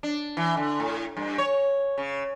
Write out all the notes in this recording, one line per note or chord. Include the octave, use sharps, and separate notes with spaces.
D4
E3
D3
A2
G2
C#5
C#3